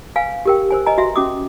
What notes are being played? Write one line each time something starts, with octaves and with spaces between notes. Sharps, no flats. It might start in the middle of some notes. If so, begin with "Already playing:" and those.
B4 F5 G#5
G4 A#4 G5
A#4 C5 G#5
B4 D#5 G#5 A#5
F#4 E5 C6
C#4 F#4 D6 D#6